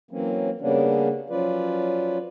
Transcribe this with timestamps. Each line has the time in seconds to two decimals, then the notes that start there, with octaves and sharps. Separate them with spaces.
0.11 E3 F#3 A#3 C4 C#4
0.61 C#3 G3 A#3 B3 C#4 D4
1.30 F3 F#3 C#4 F4 B4 D5